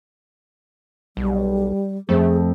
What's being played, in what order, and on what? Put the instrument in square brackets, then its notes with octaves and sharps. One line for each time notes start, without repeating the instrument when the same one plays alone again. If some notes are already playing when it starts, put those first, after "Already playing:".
[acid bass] B1 [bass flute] G3
[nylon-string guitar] F2 [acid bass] A3 [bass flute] G#4